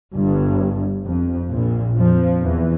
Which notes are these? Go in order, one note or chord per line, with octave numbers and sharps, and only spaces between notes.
G1 G2
F2
A#1 A#2
F2 F3
E2 E3